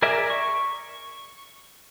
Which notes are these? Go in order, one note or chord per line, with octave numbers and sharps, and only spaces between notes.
G#4 A#4 D5 E5
C#6